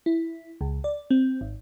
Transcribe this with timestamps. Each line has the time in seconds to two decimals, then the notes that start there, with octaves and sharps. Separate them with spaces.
0.06 E4
0.61 C#2
0.84 D5
1.10 C4
1.41 G#1